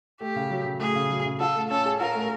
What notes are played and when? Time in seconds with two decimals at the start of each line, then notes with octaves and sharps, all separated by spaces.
0.20 A3 G4
0.36 C#3
0.51 F#3
0.65 C#3
0.80 A3 G#4
0.95 C#3
1.10 F#3
1.25 C#3
1.40 F4 A4
1.55 A3
1.70 C#4 A4
1.86 G#4
2.00 F4 A#4
2.15 A3